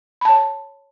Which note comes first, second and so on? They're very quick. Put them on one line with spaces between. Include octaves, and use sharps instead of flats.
B5 A5 C#5